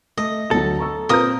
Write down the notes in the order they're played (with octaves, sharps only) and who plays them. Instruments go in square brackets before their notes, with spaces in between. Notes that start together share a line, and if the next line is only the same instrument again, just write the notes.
[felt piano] A3 [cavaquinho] D#5
[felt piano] D2 F#3 [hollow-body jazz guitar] A4
[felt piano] A#5 C#6 E6
[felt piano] A#2 G6 [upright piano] C4 F4 B4 [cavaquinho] A#4 D#6